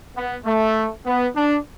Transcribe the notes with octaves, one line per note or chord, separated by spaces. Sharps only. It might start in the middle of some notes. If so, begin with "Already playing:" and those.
B3
A3
B3
D4